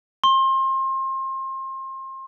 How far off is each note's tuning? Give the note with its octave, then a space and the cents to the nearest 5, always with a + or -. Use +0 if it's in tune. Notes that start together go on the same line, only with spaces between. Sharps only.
C6 +30